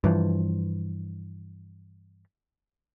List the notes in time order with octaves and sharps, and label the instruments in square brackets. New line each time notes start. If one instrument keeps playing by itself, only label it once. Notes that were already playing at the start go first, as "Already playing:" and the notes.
[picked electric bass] G2 E3 F3